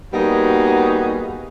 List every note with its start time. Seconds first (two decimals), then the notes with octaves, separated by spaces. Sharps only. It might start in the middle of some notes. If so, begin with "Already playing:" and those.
0.14 G3 A#3 B3 D#4 F#4 G#4